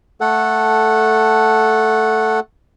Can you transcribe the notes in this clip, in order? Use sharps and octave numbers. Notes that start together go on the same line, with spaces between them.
A3 A4 F#5